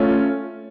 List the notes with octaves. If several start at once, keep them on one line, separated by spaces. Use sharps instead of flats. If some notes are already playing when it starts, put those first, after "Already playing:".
Already playing: A3 C#4 F4